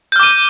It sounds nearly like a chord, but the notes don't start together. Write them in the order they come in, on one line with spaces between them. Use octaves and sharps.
G6 F6 D6 D#7